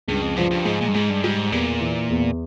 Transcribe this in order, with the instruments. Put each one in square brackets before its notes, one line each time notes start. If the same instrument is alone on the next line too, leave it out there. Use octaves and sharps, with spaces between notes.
[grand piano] C#2 [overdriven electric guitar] G2
[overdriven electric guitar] F2
[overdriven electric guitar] G2 [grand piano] F3
[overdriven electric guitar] G2
[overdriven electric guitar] G#2 [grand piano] G#3
[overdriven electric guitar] A#2
G2
[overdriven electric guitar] G#2 [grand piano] G#3
[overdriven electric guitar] G2
[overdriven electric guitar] G#2 [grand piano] G3
[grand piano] E2 [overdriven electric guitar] A#2
[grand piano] E3
E2